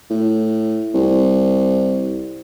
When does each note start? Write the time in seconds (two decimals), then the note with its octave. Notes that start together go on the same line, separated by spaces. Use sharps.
0.11 A2
0.94 C2